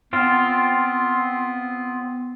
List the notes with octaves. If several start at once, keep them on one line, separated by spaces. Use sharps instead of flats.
B3 C4 F4